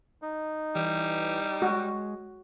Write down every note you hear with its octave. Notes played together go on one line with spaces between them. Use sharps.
D#4
E3 G3
G#3 F#4